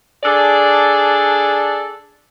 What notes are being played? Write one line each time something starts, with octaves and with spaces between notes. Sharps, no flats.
D4 G#4 A4 D5